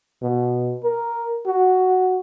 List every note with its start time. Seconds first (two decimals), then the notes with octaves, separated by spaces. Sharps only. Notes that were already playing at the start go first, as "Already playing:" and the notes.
0.23 B2
0.84 A#4
1.47 F#4